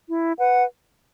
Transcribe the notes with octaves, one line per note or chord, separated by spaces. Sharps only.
E4
B4 F#5